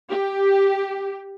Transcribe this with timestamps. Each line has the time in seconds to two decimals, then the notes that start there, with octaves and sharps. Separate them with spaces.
0.10 G4